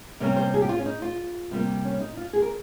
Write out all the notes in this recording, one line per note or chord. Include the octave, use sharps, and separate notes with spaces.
C3 G3 A#3 C#4
C5
G#4
G4
F4
C#4
D#4
F4
C3 G3 A#3
C#4
D#4
F4
G#4
A#4